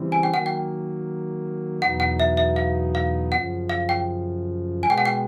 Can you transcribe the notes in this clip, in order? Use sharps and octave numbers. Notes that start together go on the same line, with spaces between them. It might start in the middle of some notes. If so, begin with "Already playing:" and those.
Already playing: C#3 E3 G3 C4
G#5
G5
D#3 F#3 A#3 F#5
G5
E2 B2 F#3 B3 D#4 F#5
F#5
E5
E5
F5
F5
F#2 C#3 F3 F#5
F5
G5
B2 G#3 B3 G#5
G5
F#5
G5